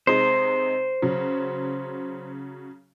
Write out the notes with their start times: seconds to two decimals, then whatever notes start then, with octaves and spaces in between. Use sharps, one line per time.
0.07 C3 G#3 D#4 C5
1.02 C#3 F#3